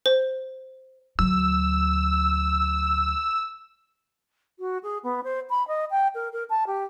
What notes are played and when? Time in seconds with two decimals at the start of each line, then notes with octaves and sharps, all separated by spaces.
0.06 C5
1.19 D2 F#3 E6
4.59 F#4
4.83 G#4
5.03 B3
5.24 C5
5.49 B5
5.67 D#5
5.90 G5
6.14 A#4
6.32 A#4
6.50 A5
6.67 G4